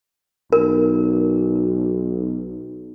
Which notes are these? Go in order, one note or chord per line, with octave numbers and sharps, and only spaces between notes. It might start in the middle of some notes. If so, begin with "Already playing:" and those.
B1 A#4